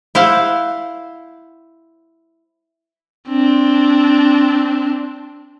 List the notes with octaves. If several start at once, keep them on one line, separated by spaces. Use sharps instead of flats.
E4 C5 F5 F#5
C4 D4